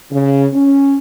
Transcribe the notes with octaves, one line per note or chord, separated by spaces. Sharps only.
C#3
C#4